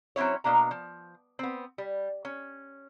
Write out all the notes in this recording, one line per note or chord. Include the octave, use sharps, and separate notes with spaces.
F#3 C4 C#4 E4 C#5
B2 A#3 C#4 D4 A#5
F3
B3 C4
G3
C#4